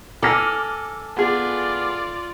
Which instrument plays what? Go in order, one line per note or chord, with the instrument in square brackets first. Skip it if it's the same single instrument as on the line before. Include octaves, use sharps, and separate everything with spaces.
[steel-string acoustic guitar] A4 G#5 [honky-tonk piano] D6 F6 A#6
[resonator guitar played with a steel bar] B3 G#4 [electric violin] F4 D5